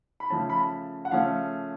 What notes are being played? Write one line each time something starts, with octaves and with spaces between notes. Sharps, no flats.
B5
C#3 F3 A3 C#4 A5
B5
A5
F#5
C#3 F3 A3 C#4 F5